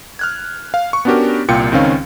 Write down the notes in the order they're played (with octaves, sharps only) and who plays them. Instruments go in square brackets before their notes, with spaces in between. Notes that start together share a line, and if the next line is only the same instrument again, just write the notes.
[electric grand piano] F6 F#6 G#6
F5
C#6
B3 C#4 D4 F#4 G4 A#4
C2 A#2 F4 G5 C#7
C#2 D#3 C4 C#4 F5